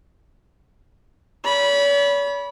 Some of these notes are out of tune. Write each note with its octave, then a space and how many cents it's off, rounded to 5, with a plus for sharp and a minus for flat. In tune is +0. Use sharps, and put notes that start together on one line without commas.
C#5 +45 B5 -15